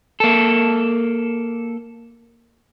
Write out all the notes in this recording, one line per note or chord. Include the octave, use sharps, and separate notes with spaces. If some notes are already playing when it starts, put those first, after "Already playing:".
A#3 A4